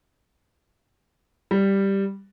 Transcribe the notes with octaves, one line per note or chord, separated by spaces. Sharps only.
G3